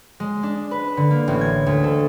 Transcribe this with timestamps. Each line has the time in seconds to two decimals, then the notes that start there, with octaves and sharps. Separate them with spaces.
0.20 G#3
0.43 D4
0.71 B4
0.97 D3
1.11 A#3
1.28 A1
1.41 G#6
1.66 D2
1.84 A4